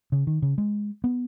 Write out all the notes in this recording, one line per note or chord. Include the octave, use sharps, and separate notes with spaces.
C#3
D#3
C#3
G#3
B3